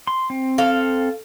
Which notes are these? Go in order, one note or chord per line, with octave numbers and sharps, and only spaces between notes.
C6
C4
A4 F5